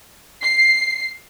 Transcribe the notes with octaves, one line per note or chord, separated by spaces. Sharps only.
C7